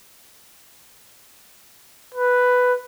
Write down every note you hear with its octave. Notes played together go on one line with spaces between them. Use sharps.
B4